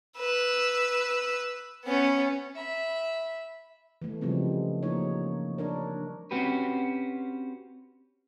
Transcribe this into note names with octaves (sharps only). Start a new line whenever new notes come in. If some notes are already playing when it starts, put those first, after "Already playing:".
B4 E6
B3 C#4
E5 B5
E3 A3
C#3 F3 G3 G#3 C4
F3 A#3 D#4 C#5
D4 A#4 C#5
C4 C#4 F#4 G4 B4